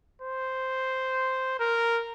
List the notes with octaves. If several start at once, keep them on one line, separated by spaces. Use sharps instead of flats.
C5
A#4